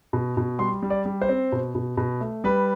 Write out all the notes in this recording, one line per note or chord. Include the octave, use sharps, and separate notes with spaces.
B2
B2
G3 C6
G3
D5
G3
C5
C4
B2
B2
B2
A3
G3 B4